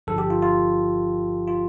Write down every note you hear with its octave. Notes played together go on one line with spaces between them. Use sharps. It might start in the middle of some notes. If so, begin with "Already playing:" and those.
G1 G2 D3 F3 A4
G4
F4
F4
F4